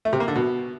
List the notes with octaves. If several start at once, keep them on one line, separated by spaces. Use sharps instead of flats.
A3
C3
A#3
D3
B2